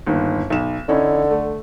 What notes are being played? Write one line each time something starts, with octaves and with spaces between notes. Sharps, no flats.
G1 D#2
B1 E7
D3 C#4 D#4 E4
A3